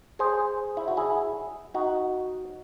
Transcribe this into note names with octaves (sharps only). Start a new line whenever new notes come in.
G#4 C5
E4
F#4
E4 G#4
D#4 F#4